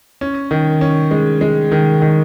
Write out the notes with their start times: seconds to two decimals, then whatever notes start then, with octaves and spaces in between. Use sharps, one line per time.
0.21 C#4
0.51 D#3
0.81 C#4
1.11 G#3
1.41 G#3
1.72 D#3
2.02 D#3